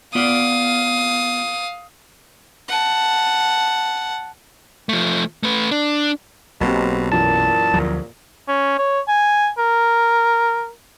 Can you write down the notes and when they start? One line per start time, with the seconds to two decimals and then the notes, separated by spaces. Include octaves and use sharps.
0.15 B3 F4 D5 F5 D#6
2.68 F#5 A5
4.89 F3 A3
5.43 A3 B4
5.71 D4
6.61 B1 B2 A#3 C4 G4
7.12 F#2 A#2 E3 A5
7.74 D2 F3 F#3
8.48 C#4
8.78 C#5
9.08 G#5
9.58 A#4